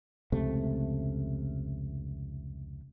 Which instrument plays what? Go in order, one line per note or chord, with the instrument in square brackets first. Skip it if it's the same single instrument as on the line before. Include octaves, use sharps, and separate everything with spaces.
[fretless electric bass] F1 C#2 C3 A3